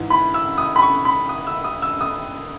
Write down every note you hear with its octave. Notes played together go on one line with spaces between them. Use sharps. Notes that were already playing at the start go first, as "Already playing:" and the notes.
Already playing: G#2 E3
B5
E6
D#6
B5
C#6
B5
D#6
E6
D#6
E6
D#6